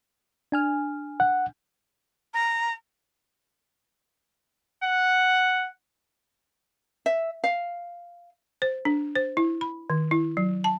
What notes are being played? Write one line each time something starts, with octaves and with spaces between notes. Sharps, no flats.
D4 G#5 F6
F#5
A#5
F#5
E5
F5
C5
D4
C5
E4
B5
D#3
E4
F#3
A5